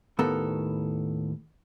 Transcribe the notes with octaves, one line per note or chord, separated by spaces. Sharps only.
D#2 A2 B3 A4 A#4